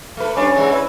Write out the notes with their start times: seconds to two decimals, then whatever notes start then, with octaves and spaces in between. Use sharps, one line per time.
0.17 A3 B4
0.37 G3 C#4 D4 B4
0.55 G#2 E3 G#3
0.71 E4 B4